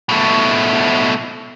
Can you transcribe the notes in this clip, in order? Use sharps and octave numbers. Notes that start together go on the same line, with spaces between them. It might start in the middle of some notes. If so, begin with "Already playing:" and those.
B2 A3